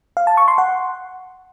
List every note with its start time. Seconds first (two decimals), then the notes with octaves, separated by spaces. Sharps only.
0.17 F5
0.27 A5
0.37 C#6
0.48 C6
0.58 F#5